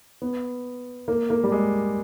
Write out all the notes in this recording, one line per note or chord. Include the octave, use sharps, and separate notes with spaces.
B3
A#3
A#3
G3
G#3